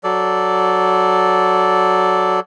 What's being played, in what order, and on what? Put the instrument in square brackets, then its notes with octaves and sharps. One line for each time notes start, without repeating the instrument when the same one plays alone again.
[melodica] F#3 A4 D5